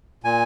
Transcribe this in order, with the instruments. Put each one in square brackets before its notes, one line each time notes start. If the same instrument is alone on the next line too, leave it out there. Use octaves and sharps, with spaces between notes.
[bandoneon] A#2 G#5